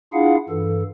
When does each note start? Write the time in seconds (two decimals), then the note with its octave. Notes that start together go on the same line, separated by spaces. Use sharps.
0.13 D4 E4 F4 G#4 F5 F#5
0.49 G2 E3 A4